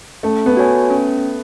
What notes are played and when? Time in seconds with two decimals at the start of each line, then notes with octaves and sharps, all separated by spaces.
0.23 A3 C#4
0.46 B3
0.57 F#4 C#5 G#5
0.90 C#4